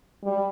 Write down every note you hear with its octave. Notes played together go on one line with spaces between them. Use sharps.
G3